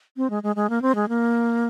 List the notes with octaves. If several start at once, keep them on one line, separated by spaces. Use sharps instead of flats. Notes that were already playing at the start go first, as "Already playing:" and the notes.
C4
G#3
G#3
G#3
A#3
C4
G#3
A#3